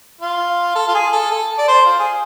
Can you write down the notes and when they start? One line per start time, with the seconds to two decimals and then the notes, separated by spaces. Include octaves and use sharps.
0.21 F4
0.75 A4
0.87 F4
0.94 G#4
1.12 A4
1.31 A4
1.58 D5
1.68 C5
1.85 F4
1.99 G#4